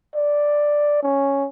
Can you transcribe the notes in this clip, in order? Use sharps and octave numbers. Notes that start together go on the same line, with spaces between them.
D5
C#4